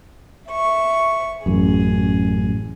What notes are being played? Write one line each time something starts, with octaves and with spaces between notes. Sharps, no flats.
E5 C#6
A1 F#2 G#4